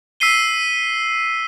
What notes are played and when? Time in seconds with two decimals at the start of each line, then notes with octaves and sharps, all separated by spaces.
0.20 E6 B6 C7 D#7 G7